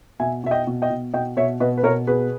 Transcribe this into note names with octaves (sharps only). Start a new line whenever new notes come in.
B2 E5 G#5
B2 E5
D#5 G5
B2
D#5 G5
B2
B2 D#5 G5
B2 C#5 E5
B2 B4 D#5
B4
B2 A#4 C#5
B2 G#4 B4